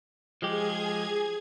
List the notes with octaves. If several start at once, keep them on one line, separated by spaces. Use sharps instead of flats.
F3 G#3 G4 G#4 G#6